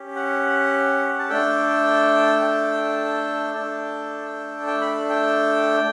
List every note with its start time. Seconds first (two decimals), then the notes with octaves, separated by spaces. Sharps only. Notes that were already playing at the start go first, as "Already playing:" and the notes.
Already playing: C#4 G4
0.16 F#5
1.19 A5
1.29 A3 D4 A4 G5
2.41 G5
3.55 A3 D4 A4
4.67 G5
4.81 B5
5.10 G5